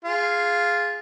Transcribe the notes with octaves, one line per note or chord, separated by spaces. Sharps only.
F4 G#4